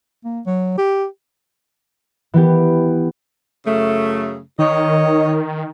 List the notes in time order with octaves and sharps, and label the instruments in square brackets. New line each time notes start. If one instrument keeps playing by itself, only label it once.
[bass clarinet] A#3
F#3
G4
[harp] E3 B3 G4
[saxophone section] F#2 C#3 A3
[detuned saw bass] D#3 [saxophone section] C#5 D#5